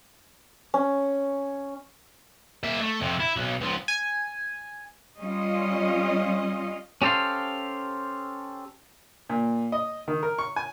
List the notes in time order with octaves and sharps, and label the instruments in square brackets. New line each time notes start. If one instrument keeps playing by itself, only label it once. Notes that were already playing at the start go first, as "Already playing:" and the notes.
[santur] C#4
[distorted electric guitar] A#3 E5
A3
F2 C3
E4
B1
C#2 F3
[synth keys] G#5
[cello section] G3 C#4 F4 D#5
[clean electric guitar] C#4 G4 A4 C5 F5
[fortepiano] A#2
D#5
D#3
A#4
C#6
G#5